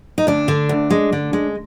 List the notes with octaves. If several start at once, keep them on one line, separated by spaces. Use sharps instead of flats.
D#4
D2 D4
D3
D2
G#3
D3
G#3